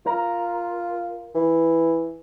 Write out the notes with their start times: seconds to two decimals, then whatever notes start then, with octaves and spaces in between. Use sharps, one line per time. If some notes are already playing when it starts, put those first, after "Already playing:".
0.06 F4 A#4
1.35 E3